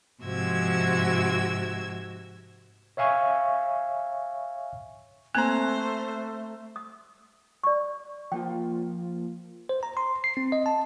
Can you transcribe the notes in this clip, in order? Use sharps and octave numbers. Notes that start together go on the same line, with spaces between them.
G#2 C3 F3 F#4 E6 G#6
C#5 E5 F5 G#5 C#6
A3 A#3 C4 C5 A#5 F#6
D#6
D5 C#6
F3 A#3 F4 G5
C5
A#5
C6
C7
C4
D#5
A5